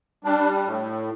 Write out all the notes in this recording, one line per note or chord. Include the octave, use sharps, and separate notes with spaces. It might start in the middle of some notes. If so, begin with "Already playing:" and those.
G3 D4
A2